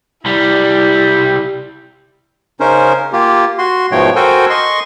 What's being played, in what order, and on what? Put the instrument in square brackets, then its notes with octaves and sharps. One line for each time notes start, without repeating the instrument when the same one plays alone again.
[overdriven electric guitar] C2 G3 [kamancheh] E4
[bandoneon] C#3 C#4 D#4 A#4 C5
A#3 F4 G4
F#4 C6
G#2 B2 F3 A3 C#5 G5
F#4 A4 A#4 C5 G5 G#5
D#5 C6 C#6